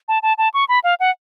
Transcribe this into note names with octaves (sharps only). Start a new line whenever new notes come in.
A5
A5
A5
C#6
B5
F5
F#5